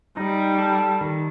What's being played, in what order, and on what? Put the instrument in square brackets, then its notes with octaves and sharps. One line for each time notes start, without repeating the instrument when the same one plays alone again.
[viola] G3 [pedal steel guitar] D#4
[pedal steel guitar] A4
D#3